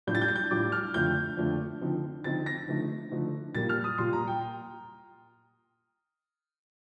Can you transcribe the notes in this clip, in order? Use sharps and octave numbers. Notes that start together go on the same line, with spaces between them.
A2 G3 D4 F4 G6
A6
G6
A6
G6
A2 G3 D4 F4 D6
F6
F2 D3 A3 D4 F4 G6
F2 D3 A3 D4 F4
D3 F3 C4 D#4
D3 F3 C4 D#4 A6
A#6
D3 F3 A3 D#4
D3 F3 A3 D#4
A#2 G3 A#3 F4 A6
F6
D#6
A#2 G3 A#3 F4 C6
A#5
G5